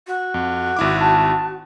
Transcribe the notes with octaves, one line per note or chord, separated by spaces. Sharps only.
F#4
F2
G#1 E4 D6
A5